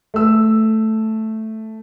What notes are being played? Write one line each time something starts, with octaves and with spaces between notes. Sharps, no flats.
A3 E6